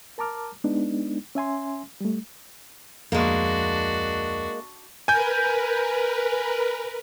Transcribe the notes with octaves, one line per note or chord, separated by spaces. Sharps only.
A#4 A5 A#5 D6 F6
G#3 B3 D4 D#4
C#4 E5 G#5 C6
G3 A3
D1 F2 G#3 A#3 D4 F#4
A#4 B4 G#5 G6